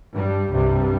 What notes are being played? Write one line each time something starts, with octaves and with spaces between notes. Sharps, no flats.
G2 G3
C2 G2 C3 G3